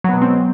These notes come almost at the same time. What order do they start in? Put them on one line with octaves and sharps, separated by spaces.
F#3 B3 B2 G#3 C4